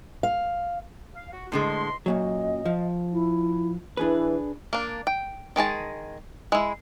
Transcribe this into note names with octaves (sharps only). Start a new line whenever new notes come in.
F5
F5
F#4
E2 A2 D3 G#3 D#5 C6
F#2 A#2 F#3 D#5
F3
E4
E3 D4 G#4 B4
A#3 D4
G5
D#3 G#3 G#4 A5
G#3 E4